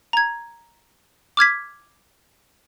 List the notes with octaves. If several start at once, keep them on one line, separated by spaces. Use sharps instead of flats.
A#5 G#6
D6 F6 G#6 B6